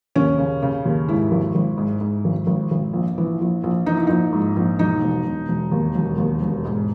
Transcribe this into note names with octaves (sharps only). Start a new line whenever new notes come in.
D#2 C#4
C#3
C#3
D#2
G#2 E4
G#1
G#1
G#2
G#2
G#1
G#1
G#1
A#1
E3
A#1
A#1
E3 D#4
E4
A#1 D#4
G#2
A#1
E1 D#4
E1
E1
E1
D#2
E1
D#2
E1
G#2